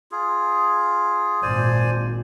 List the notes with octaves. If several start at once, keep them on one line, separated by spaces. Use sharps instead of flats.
F4 G#4
G#1 A#2 C5 D5 G#5